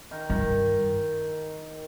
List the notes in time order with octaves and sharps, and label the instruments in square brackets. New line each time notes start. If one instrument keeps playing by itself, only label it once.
[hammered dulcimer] D#3
[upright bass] G2 [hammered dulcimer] D#3